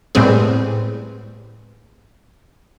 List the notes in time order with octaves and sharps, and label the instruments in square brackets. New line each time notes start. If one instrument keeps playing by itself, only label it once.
[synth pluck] A2 G3 G#3 B3 C4 G#4